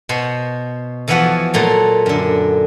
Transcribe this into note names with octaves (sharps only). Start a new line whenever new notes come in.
B2 C5 F#5
E2 E3 F3 B3 F#4 F#5
A#2 F#3 A3
F#2 D3